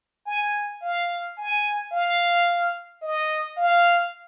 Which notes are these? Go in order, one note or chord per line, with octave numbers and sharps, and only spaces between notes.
G#5
F5
G#5
F5
D#5
F5